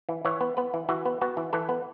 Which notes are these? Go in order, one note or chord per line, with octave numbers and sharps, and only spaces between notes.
E3
E3 C#5
B3
B3 B4
E3
E3 F#4
B3
B3 F#4
E3
E3 A4
B3